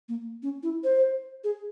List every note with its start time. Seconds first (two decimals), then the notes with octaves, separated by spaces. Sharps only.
0.09 A#3
0.43 C#4
0.63 E4
0.84 C5
1.44 G#4